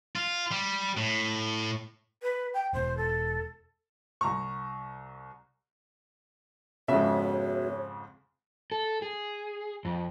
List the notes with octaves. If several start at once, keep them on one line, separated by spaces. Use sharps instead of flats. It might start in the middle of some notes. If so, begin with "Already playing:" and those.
F4
G3
A2
B4
G5
E1 E2 B2 C5
A4
C2 A#5 C#6
F2 G#2 C#3 B3 F#4 G#4 C#5 E5
A4
G#4
F2